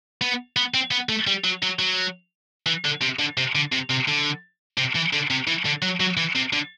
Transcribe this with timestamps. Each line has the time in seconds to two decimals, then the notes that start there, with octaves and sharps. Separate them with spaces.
0.21 B3
0.57 B3
0.74 C4
0.91 B3
1.09 A3
1.27 G3
1.44 F#3
1.62 F#3
1.79 F#3
2.66 E3
2.85 D3
3.02 C3
3.19 D3
3.38 C3
3.55 D3
3.72 C3
3.90 C3
4.07 D3
4.78 C3
4.95 E3
5.13 D3
5.30 C3
5.47 E3
5.66 D3
5.82 F#3
6.00 F#3
6.17 E3
6.35 C3
6.53 D3